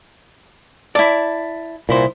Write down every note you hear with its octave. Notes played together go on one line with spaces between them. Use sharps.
E4 D5 A5
C2 A#2 E4 C5